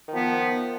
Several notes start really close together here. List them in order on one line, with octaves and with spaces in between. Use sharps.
D#3 F3 B3